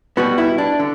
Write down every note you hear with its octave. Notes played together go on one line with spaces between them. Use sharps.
B2 G3 B3 F#4
E4
D4
D3